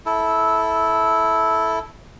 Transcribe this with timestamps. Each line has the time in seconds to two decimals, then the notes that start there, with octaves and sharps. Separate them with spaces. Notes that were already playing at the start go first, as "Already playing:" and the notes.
0.06 E4 A4